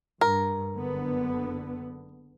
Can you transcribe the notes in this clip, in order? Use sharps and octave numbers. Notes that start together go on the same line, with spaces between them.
G2 A#4
F#1 D3 B3